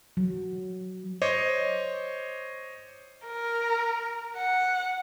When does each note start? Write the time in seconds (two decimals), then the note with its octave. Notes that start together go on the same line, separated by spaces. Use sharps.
0.17 F#3
1.22 C5 C#5 D#5 D6
3.27 A#4
4.37 F#5